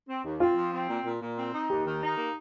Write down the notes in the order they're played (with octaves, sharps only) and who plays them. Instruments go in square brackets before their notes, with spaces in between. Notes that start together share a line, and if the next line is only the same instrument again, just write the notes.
[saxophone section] C4
D#2
[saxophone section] C4 [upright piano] F4
[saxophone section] F3
C4
A#2
A#2
A#2
C4
D#4
[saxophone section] D#2 [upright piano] G4
[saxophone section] D#3
D#4
A#3